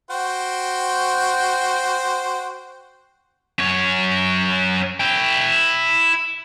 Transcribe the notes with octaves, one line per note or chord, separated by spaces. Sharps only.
F#4 C5 G5
F#2 C#5
E4 G5